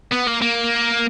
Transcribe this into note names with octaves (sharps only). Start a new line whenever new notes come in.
B3
A#3
A#3